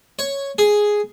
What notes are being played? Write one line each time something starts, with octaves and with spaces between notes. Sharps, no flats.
C#5
G#4